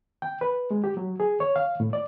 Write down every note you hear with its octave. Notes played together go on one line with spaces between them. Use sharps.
G5
B4
G#3
G4
F#3
G#4
C#5
F5
A2
D5